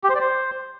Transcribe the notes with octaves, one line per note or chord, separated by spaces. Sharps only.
G4
C5
D5
C5